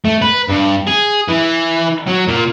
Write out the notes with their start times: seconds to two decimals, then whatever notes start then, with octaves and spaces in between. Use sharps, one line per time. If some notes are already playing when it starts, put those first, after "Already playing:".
0.05 A3
0.22 B4
0.48 G2
0.87 G#4
1.29 E3
2.07 F#3
2.28 A#2